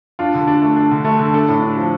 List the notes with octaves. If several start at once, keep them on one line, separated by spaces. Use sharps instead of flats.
D4 F4
D3
D4
A3
D4
D3
A3
D3
D4 A4
A2
D4
F3